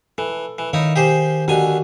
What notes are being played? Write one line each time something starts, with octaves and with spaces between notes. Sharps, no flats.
E3 A4
E3
D#3 D#4 E4 C#5 F5
G4 G#4 C5
D#2 D3 F#4 G#5